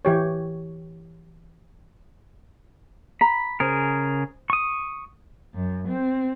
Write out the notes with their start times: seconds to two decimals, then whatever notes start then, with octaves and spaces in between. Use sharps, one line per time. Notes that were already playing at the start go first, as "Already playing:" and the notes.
0.05 E3 G4 C#5
3.21 A#5 B5
3.60 C#3 G#4 A#4 C5
4.50 C#6 D#6
5.54 F#2
5.88 C4